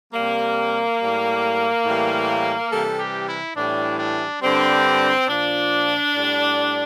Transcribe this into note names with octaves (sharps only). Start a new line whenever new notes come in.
C3 G3 A#3
A2 G3
A2 E3 G3
C3 E3 G3 A4
G4
E4
A2 E3 G3 D4
D4
G2 D3 G3 C4
A#2 F3 D4
A2 G3